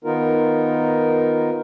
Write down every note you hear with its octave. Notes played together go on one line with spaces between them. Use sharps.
D#3 B3 D#4 F4 A#4